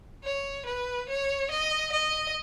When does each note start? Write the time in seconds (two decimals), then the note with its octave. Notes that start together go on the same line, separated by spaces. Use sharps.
0.24 C#5
0.66 B4
1.09 C#5
1.51 D#5
1.93 D#5